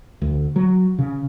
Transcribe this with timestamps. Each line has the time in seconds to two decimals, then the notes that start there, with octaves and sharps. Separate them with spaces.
0.22 D2
0.56 F#3
0.99 C#3